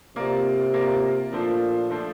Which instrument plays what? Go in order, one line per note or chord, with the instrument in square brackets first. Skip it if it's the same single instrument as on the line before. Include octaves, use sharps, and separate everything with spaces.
[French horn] C3 [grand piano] A#3 F4 A#4 D5
[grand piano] A#3 F4 A#4 D5
[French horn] A#2 [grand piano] F3 A3 D4 F4 C5
[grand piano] F3 A3 D4 F4 C5